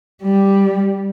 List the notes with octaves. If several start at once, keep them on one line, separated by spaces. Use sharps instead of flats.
G3